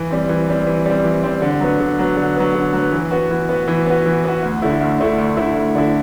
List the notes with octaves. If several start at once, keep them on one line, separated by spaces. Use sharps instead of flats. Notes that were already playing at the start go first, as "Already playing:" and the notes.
Already playing: E3
G3 C4
E3
G3 C4
E3
G3 C4
E3
G3 C4
D3
F#3 B3
D3
F#3 B3
D3
F#3 B3
D3
F#3
B3
E3
B3 F#4
E3
B3 F#4
E3
B3 F#4
E3
B3 F#4
D2
D3 A3 E4
D2
D3 A3 E4
D2
D3 A3 E4
D2
D3 A3 E4